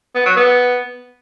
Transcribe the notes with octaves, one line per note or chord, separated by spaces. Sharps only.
B3
F#3
B3